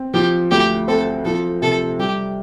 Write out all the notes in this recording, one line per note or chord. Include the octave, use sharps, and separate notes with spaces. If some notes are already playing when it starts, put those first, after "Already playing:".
Already playing: C4
F3 G4
D2 G4
C4 A4
F3 A4
C3 A4
G3 G4